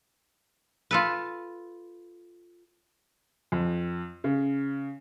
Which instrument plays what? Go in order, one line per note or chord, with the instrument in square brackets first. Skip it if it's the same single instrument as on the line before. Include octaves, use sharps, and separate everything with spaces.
[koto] F4 A4 B4
[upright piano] F2
C#3